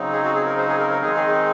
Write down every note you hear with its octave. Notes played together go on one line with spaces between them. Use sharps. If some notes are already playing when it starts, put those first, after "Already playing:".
Already playing: C#3 F#3 C4 D#4
G#4
F#4
G#4
A#4
C5
G#4
A#4
A#4
D#3 G#3 C4 D#4 G#4
G#4